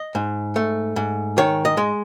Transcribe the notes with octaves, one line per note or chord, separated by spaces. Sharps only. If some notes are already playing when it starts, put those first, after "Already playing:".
Already playing: D#5
G#2
A3
G#2
D#3 C#5
D#5
G#3